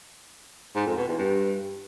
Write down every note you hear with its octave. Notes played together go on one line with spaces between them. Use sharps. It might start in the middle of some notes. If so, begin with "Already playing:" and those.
G#2
F2
B2
E2
G2